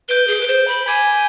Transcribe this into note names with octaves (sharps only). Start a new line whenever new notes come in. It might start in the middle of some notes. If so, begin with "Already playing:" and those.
B4 G6 D7 G7
G#4
B4
C5
B5
G#5 D6 G#6 B6